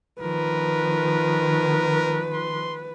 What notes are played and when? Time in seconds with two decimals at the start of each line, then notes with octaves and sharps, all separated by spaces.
0.22 D#3 F3 A#4 B4
2.34 C6